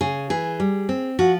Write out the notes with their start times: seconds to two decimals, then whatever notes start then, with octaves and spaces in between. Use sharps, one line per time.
0.01 C#3 G#4
0.30 E3 G#4
0.60 G3
0.89 C4
1.19 F3 F#4